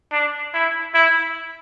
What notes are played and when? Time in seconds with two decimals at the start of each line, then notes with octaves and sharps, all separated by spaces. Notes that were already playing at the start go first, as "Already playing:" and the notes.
0.13 D4
0.54 E4
0.95 E4